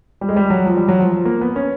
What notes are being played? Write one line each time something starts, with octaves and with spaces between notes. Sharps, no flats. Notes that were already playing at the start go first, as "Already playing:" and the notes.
G3
G#3
G3
F#3
F3
G3
F#3
F3
F3
A#3
B3
C#4